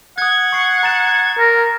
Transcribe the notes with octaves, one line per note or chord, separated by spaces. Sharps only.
F#5 D#6 F#6 G#6
C#6 C7 C#7
A#5 A6 E7
A#4